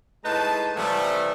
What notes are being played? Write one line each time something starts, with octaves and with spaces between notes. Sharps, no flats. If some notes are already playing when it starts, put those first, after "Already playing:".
A2 G#3 D#4 B4 A5
C3 E3 F3 G3 A3